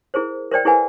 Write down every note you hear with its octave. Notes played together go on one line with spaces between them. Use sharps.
E4 G#4 A#4 C5
A#4 C5 D5 G5
E4 G#4 A#4 B4 F#5 G#5